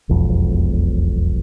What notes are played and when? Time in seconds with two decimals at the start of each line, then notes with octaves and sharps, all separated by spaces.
0.09 E1 B1 F2